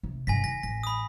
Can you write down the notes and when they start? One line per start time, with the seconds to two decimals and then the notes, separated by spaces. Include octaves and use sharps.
0.03 C3
0.27 G2 B2 G#5 A#6 B6
0.44 D#3 A#6
0.63 A1 A#6
0.83 B5 D#6